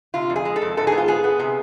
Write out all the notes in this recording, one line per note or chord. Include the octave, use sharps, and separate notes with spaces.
C3 F4
F2
G#4
G#3
A4
F2
G#2 A4
G#4
B3
F4
B3 G#4
B3
C3